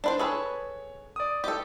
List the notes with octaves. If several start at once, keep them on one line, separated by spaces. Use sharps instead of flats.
D4 B4 C5
G#4 A4 B4 C#5
D5 D#6
G4 A4